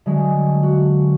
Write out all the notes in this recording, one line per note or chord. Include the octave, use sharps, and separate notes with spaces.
D3 F#3 G#3
F#4